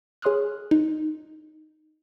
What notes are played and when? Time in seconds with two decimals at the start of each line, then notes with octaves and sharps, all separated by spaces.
0.22 G#4 C#5 C6 D#6 F6 F#6
0.71 D#4